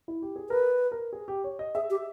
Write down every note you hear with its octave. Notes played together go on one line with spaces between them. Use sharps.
E4
G4
G#4
A#4 B4
A#4
G#4
G4
C#5
D#5
G#4 E5
G4